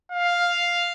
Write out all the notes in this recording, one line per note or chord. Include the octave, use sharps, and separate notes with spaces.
F5